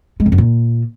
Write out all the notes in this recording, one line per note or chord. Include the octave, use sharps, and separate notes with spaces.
G#3
F2
F#2
A#2